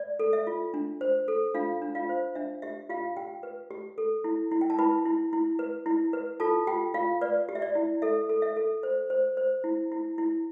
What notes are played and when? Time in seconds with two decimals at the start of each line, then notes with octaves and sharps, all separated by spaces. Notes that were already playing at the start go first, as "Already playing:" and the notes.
Already playing: D5
0.19 A4
0.33 E5
0.47 F4
0.74 D4
1.01 C5
1.28 A4
1.54 D4 F4 F5
1.82 D4
1.95 F4 F5
2.09 C5
2.35 D4 E5
2.62 G4 E5
2.89 F4 G4 F5
3.17 G4 G5
3.43 B4
3.71 G4
3.98 A4
4.24 E4
4.51 E4
4.61 G5
4.70 A5
4.79 E4 B4 B5
5.06 E4
5.33 E4
5.59 B4
5.86 E4
6.13 B4
6.40 F4 A4 A5
6.67 F4 G4 G5
6.94 F4 F5
7.21 B4 D5
7.49 G4
7.55 E5
7.62 D5
7.75 E4
8.02 A4 E5
8.29 A4
8.42 E5
8.56 A4
8.83 C5
9.10 C5
9.37 C5
9.64 E4
9.92 E4
10.18 E4